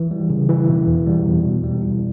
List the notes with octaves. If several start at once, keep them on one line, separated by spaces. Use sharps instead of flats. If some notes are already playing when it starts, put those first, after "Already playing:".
Already playing: E3
G3
C#3
E3
B2
E2
G3
E2
B2
G3
E4